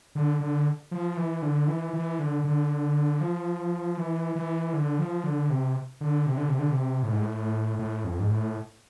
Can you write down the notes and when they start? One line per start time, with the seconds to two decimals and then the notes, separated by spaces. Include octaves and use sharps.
0.15 D3
0.41 D3
0.91 F3
1.17 E3
1.42 D3
1.68 E3
1.93 E3
2.19 D3
2.45 D3
3.21 F3
3.97 E3
4.35 E3
4.73 D3
4.99 F3
5.24 D3
5.50 C3
6.01 D3
6.26 C3
6.37 D3
6.49 C3
6.59 D3
6.71 C3
7.03 A2
7.12 G#2
7.21 A2
7.79 A2
8.04 F2
8.20 G#2
8.30 A2